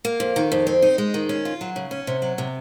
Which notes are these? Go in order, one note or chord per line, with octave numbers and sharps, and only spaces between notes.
A#3
F2
D#3
F2
C4
D#4
G#3
D#3
C#4
F4
F#3
C#3
C#4
C3
F#3
C3